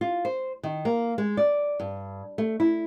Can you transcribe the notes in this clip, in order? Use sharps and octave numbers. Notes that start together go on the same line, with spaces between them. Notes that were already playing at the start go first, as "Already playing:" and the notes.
F4
C5
D#3
A#3
G#3
D5
G2
A3
E4